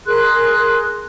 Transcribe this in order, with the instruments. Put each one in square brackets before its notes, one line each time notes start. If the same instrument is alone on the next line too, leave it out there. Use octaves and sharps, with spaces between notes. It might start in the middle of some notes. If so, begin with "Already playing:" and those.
[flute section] G#4 A#4 C6 F#6